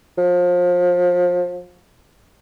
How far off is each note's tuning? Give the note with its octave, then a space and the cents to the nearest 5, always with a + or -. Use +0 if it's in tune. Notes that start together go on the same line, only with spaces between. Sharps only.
F3 +30